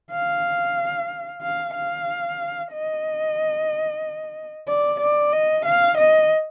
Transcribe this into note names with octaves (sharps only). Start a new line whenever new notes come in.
F5
F5
F5
D#5
D5
D5
D#5
F5
D#5